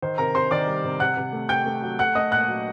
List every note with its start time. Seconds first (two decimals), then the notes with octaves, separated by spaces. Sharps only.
0.02 D#3 C5
0.18 C3 A#4 A#5
0.35 C3 C5 C6
0.51 D#3 D5 D6
0.67 G3
0.84 C3
1.00 C3 F#5 F#6
1.17 C3
1.33 A3
1.49 C3 G5 G6
1.66 A3
1.82 F#3
1.99 A3 F#5 F#6
2.15 A3 D#5 D#6
2.31 A#2 F#5 F#6
2.48 F#3